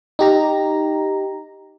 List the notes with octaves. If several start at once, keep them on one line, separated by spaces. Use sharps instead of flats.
D#4 G4 A#5